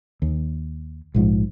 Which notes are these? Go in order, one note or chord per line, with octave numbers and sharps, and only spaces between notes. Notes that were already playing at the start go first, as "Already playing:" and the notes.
D#2
A#1 G#2 F3